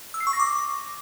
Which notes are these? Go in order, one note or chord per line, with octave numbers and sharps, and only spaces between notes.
E6
C7
C#6
A#6
D6